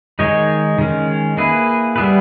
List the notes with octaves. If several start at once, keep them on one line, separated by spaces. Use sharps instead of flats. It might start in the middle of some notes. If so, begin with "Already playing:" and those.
D#3 G#3 D#4 G#4 C#5
D#3 G#3 C#4
A#3 E4 G#4 B4
G3 B3 E4 G#4 B4